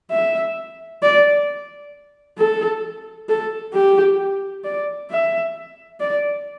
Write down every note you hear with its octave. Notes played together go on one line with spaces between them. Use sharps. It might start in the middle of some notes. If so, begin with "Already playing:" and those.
E5
D5
A4
A4
G4
D5
E5
D5